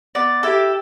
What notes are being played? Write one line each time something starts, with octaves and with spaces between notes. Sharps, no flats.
B3 D5
E4 G4 A4